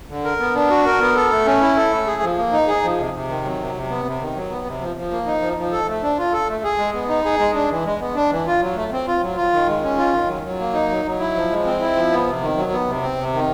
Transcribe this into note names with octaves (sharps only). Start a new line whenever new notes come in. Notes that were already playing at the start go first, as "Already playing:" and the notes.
D3
A#4
B3
D4
F#4
A#4
B3
A4
A3
C#4
E4
A4
A3
G#4
F3
A#3
D#4
G#4
F3
C3
C3
D#3
F#3
C3
C3
B3
C3
D#3
F#3
B3
C3
F3
F3
A#3
D#4
F3
F3
A4
A3
D4
F4
A4
A3
G#4
G#3
B3
D#4
G#4
G#3
D4
E3
G#3
B3
D4
E3
F4
F#3
A3
C4
F4
F#3
F4
D#3
G#3
C#4
F4
D#3
F#3
F#3
A#3
D#4
F#3
F#3
E4
F3
G#3
C4
E4
F3
B3
C3
D#3
F#3
B3
C3
C4
C3
D#3